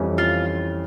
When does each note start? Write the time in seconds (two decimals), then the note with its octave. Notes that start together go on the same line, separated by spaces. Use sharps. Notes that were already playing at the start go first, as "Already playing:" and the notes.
Already playing: F2 E3 G3 C#4 E4
0.18 F4